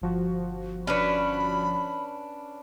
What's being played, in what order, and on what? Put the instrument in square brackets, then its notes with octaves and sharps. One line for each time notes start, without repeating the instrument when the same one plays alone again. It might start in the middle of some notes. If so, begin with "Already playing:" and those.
[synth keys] G1 F3 F#4
[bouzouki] C#4 D4 B4 [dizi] B5